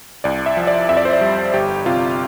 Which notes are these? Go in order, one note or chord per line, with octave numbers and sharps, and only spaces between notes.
C2 D5
E5
F3
D5
F2 E5
D5
C5
D5
G3
G1 G4
C3 F4